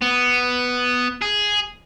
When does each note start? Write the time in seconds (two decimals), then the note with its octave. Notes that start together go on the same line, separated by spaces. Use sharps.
0.01 B3
1.22 G#4